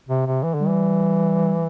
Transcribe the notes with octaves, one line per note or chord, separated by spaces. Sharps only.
C3
C3
E3
D3
G3
E3